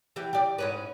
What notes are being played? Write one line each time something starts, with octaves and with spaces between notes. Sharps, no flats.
E3 G4
G4 D5
G#2 C#4 B4